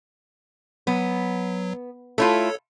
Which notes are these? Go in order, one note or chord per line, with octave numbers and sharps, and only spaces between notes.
F#3 B3
A3 E4 F4 A4 C#5